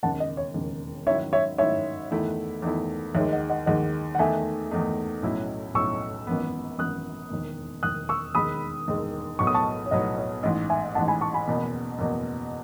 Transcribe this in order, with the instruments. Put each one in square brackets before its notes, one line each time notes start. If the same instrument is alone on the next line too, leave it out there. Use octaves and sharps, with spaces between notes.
[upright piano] E1 D#2 C#3 [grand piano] F#5 A5
[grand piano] D#5
C#5
[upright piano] E1 D#2 C#3
[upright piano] G#2 D#3 F#3 C#4 E4 [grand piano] C#5 E5
[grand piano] C#5 E5
[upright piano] G#2 D#3 F#3 C#4 E4 [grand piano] C#5 E5
[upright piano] E2 D#3 A3 E4
E2 D#3 A3 E4
[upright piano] D#2 D#3 G#3 [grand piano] C#5 E5
[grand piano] D#5 F#5
D#5 F#5
[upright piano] D#2 D#3 G#3 [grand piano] D#5 F#5
[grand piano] F#5
[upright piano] E2 D#3 A3 D#4 [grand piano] E5 G#5
[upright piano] E2 D#3 A3 D#4
B1 A2 F#3 C#4 E4
[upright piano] B1 A2 F#3 C#4 E4 [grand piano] C#6 E6
[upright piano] G#1 F#2 E3 B3
[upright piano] G#1 F#2 E3 B3 [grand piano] D#6 F#6
[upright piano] E1 D#2 D#3
[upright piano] E1 D#2 D#3 [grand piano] D#6 F#6
[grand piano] C#6 E6
[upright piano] E1 D#2 D#3 G#3 [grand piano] B5 D#6
[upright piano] E1 D#2 D#3 G#3
[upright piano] B1 A2 F#3 B3 [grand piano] C#6
[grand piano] D#6
A5 C#6
C#5
[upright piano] B1 A2 F#3 B3 [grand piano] D#5
[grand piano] C#5
[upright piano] A1 G#2 E3 [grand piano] D#5
[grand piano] E5 G#5
[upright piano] A1 G#2 E3 [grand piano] F#5 A5
[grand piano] G#5 B5
A5 C#6
G#5 B5
[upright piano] F#1 E2 B2
F#1 E2 B2